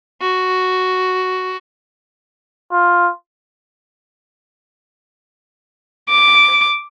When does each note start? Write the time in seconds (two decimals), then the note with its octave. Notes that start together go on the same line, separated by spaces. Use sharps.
0.21 F#4
2.72 F4
6.09 D6